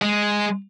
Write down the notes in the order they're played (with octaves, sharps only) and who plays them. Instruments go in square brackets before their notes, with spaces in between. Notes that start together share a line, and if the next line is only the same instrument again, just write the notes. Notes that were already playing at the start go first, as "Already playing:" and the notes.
[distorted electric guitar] G#3